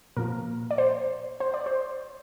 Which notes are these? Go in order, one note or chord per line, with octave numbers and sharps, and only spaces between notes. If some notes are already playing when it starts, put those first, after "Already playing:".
A#2 F3 A#3 A#4
D5
C5
C5
D5
C5